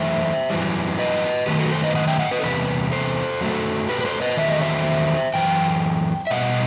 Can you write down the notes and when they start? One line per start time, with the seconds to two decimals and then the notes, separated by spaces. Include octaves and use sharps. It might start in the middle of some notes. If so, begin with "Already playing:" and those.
Already playing: F#2 E3 A3 C5 E5
0.50 F#2 E3 G3
0.99 B4 D#5
1.46 F#2 D#3 A3 G4 B4
1.59 F#4 A4
1.71 A4 C5
1.83 B4 D#5
1.95 D#5 F#5
2.08 E5 G5
2.19 D#5 F#5
2.31 B4 D#5
2.39 A4
2.43 E2 C3 G3 B4
2.92 A4 C5
3.41 F#2 F#3 A3
3.89 G4 B4
4.01 B4
4.05 A4 C5
4.21 B4 D#5
4.37 E2 D#3 F#3 A3 E5
4.50 D#5
4.62 C5 E5
5.34 F#2 E3 G5
6.27 E5
6.30 B2 G3 D#5 F#5